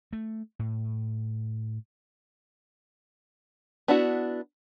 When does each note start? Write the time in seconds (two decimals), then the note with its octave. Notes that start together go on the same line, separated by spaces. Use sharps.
0.13 A3
0.59 A2
3.88 B3 D4 E4 F#4